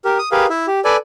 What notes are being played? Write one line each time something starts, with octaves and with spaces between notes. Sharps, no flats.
G4 A#4
D#6
G4 G#4 A#4 B4 F5
E4 E5
G4
A4 B4 D5 G#5